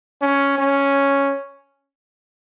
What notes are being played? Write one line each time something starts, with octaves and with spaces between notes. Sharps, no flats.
C#4
C#4